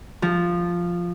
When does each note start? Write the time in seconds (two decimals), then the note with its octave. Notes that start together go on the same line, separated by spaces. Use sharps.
0.22 F3